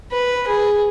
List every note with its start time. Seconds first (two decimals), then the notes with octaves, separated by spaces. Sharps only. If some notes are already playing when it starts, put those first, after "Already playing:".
0.11 B4
0.47 G#4